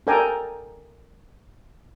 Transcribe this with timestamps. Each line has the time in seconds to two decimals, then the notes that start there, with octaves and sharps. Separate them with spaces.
0.07 A4 A#4 D5 G5 G#5 A#5